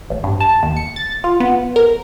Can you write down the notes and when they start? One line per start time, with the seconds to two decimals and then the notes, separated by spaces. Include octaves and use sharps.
0.10 A1
0.24 G2
0.40 A5
0.63 D#2
0.77 C#7
0.96 A6
1.24 F4
1.40 B3
1.76 A#4